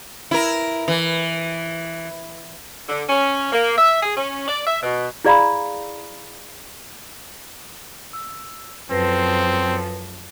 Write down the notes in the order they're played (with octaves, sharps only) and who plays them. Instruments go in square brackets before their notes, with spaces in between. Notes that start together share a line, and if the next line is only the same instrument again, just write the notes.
[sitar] E4 A#4
E3
[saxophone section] D3
C#4
A#3
E5
G#4
C#4
D5
E5
B2
[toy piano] E4 G#4 D5 F5 A#5 B5
[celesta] E6
[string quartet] F#2 F3 A4 [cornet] C4 [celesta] B4 A#6 C7